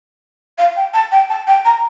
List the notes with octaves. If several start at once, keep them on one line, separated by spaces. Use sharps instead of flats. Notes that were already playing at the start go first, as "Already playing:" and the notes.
F5
G5
A5
G5
A5
G5
A#5